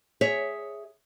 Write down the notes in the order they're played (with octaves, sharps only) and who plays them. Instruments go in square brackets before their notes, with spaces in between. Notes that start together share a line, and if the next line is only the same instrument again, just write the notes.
[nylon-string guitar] G#4 C#5 E5